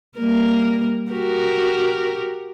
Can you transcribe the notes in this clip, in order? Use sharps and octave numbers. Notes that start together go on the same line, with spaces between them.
G3 A#3 A#4
F#4 G4 A#4